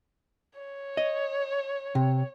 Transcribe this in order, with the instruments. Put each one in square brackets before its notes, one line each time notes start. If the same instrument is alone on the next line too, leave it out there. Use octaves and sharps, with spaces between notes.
[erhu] C#5
[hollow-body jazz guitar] D#5
C3